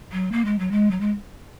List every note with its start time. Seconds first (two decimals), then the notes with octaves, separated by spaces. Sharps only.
0.12 F#3
0.32 A#3
0.45 G#3
0.58 F#3
0.71 G#3
0.90 F#3
1.00 G#3